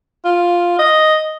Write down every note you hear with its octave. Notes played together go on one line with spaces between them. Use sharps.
F4
D#5